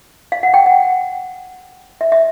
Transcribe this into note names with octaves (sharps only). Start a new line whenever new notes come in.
F5
F#5
G5
F#5
E5
E5